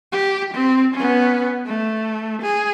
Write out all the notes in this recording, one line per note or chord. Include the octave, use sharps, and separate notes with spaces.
G4
C4
B3 C#4
A3
G#4